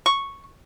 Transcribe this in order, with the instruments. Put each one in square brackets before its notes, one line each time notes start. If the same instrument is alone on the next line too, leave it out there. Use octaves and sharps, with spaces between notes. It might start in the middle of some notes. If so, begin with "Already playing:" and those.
[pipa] C#6